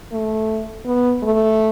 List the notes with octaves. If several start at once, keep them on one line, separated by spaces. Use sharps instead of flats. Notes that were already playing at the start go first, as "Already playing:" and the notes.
A3
B3
A3